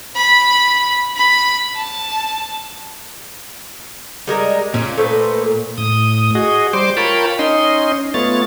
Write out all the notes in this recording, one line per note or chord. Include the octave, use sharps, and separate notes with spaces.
B5
B5
A5
G3 G#3 A#4
A#2 C#4
A3 B4 C5
A2 D#6
F#4 G#4 D#5
G3 C5 C6 D6
F4 A#4 C#5 G5 A5 B5
C#4 D#4 D#5 C6
A3 B3 F4 C#5 A6